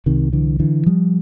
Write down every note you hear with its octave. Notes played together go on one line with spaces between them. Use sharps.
C2 C3 D#3
D3 E3
D3 E3
F3 G3